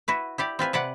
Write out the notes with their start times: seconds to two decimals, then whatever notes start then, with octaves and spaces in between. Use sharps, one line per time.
0.08 E4 F#4 B4
0.38 E4 G4 D5
0.59 C4 F4 B4 G#5
0.73 C3 B4 D5 F#5